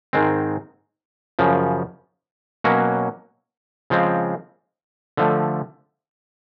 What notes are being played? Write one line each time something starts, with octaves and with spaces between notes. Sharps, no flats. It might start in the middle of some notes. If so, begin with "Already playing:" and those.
G#2 D#3 G#3 C4
F#2 C#3 F3
B2 F#3 A#3 C#4 F#4
C#3 F3 G#3 C4
D3 F3 A3